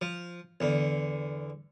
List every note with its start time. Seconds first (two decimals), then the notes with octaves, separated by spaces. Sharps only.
0.01 F3
0.60 E2 D3